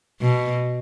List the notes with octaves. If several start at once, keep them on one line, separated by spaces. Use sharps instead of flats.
B2